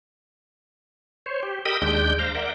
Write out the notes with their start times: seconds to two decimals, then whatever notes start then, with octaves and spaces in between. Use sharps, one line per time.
1.26 C5 C#5
1.43 G4
1.65 G4 A#4 D#5 B5 D#6 E6
1.82 D#2 G#3 D4 G5 G6
2.19 C5 F5 A#5
2.35 A#4 D5 E5 F#5 G6